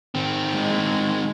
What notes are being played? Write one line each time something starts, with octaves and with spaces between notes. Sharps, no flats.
D#3 C4
G#3